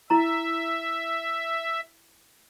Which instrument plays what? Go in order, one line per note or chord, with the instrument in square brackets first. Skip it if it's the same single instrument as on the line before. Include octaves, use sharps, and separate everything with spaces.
[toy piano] E4 A#5 [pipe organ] E5